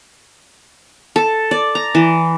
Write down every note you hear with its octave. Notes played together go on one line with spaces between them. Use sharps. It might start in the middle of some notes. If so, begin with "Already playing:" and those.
A4
D5
A#5
E3